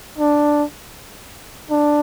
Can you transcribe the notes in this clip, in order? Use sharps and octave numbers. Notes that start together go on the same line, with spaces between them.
D4
D4